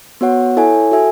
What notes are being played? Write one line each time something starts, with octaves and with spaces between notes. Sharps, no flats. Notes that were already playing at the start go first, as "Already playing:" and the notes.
B3 F#4 C#5 F#5
E4 A4 C#5 E5 G#5
F#4 A4 E5 G#5